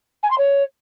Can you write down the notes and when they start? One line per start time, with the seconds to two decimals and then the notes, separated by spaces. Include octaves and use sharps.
0.23 G#5
0.30 C6
0.38 C#5